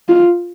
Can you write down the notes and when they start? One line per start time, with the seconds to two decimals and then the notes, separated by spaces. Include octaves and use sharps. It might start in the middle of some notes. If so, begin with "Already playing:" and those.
0.09 F4